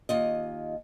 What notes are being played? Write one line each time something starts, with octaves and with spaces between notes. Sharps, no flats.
D#2 F4 D#5